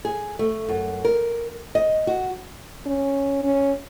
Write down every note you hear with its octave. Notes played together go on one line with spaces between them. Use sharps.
G#4
A3
F#2
A#4
D#5
F#4
C#4
C#4